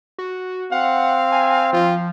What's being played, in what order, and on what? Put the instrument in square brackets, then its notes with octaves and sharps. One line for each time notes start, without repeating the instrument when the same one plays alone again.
[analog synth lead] F#4
[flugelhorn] C4 [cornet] F5 [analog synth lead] F#5
[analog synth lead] G#5
[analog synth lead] F3 [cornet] F4